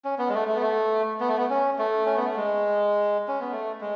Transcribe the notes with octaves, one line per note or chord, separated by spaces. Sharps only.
C#4
B3
G#3
A3
A3
B3
A3
B3
A3
B3
C#4
A3
C#4
B3
A3
G#3
C#4
B3
A3
G#3